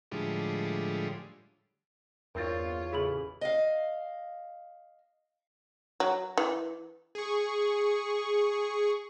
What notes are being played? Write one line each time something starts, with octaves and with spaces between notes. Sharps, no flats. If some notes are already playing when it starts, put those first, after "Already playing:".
A2 D3 F3 G3 G#3
E2 G2 C4 F4 A#4 C#5 A6
A1 C#3 E4 G#4 B5 F#7
D#5 F5
F#3
E3
G#4 C#6